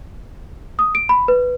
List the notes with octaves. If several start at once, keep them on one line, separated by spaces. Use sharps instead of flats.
D#6
D7
B5
B4